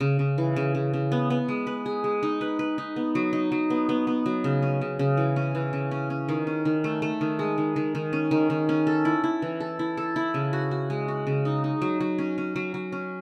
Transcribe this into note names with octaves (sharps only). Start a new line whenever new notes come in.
C#3
C#3
E3
C#3
C#3
C#3
B3
B3
G#3
B4
G#4
G#3
D#4
B4
B4
D#4
B3
F#3
D#4
F#3
B3
B3
B3
F#3
C#3
C#4
C#3
C#3
E3
C#4
E3
C#3
C#4
C#4
D#3
C#4
D#3
A3
A3
D#3
G#3
D#3
D#3
D#3
C#4
D#3
D#3
C#4
A4
E4
E4
E3
A4
E4
A4
E4
C#3
F#4
F#4
G#3
F#4
C#3
D#4
D#4
F#3
F#3
C#4
C#4
F#3
F#3
C#4